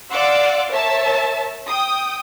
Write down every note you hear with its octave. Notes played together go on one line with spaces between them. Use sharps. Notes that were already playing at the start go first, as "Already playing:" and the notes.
D5 F5 F#5 C6 D6 E6
A#4 C#5 E5 A5
G5 D#6